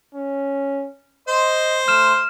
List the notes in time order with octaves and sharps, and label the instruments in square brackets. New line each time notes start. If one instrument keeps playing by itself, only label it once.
[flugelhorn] C#4
[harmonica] C5 C6 [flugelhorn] D#5
[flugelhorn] A3 [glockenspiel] F6 E7